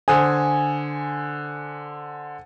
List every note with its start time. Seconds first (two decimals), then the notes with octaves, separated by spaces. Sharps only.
0.08 D3 C5 G#5 D#6